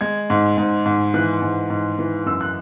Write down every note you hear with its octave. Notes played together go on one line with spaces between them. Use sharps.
G#3 G#6
G#2
G#2
G#2
E3 F#6
G#2
G#2
E3
F#2 E6
F#6